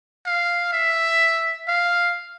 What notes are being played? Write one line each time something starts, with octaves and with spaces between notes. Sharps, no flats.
F5
E5
F5